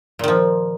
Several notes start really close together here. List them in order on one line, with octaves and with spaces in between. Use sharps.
A#2 D#3 F3